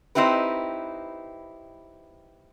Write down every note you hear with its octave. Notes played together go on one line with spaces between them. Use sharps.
C4 D#4 E4 G4 B4